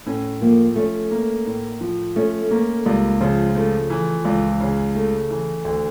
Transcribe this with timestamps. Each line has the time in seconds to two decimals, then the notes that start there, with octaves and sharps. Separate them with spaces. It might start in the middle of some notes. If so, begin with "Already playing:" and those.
0.06 A2 C#4
0.41 F3 A#3
0.76 A3 C#4
1.11 A#3
1.46 A2
1.81 F3
2.16 A3 C#4
2.51 A3 A#3
2.86 C#2 G3
3.20 C#3 F3
3.55 F3 A3
3.90 E3
4.25 C#2
4.60 C#3
4.95 A3
5.30 E3
5.65 D2